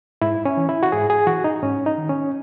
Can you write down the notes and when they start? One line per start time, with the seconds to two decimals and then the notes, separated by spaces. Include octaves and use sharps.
0.22 G#2 E4
0.45 C#4
0.57 E3
0.69 E4
0.83 F#4
0.92 G#2 G#4
1.10 G#4
1.27 E3 F#4
1.44 D#4
1.63 G#2 C#4
1.86 D#4
1.98 D#3
2.09 C#4